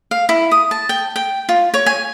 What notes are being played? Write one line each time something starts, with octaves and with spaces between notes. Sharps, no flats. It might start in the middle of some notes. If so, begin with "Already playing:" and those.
F5
E4
D#6
A5
G5
G5
F4
C#5
G#5